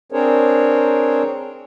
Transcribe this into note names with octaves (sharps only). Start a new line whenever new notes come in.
C4 D4 G#4 A#4 C5 C#5